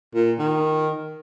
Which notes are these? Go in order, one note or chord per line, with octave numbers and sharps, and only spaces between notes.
A#2
D#3